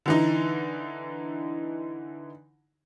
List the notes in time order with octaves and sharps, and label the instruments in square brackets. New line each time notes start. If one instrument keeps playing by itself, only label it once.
[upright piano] D3 E3 D#4